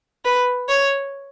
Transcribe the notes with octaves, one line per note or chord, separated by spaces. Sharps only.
B4
C#5